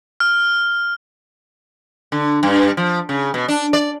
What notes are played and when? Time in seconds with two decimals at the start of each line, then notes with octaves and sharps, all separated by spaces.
0.20 F6
2.12 D3
2.43 G2
2.77 F3
3.09 C#3
3.34 B2
3.48 D4
3.73 D5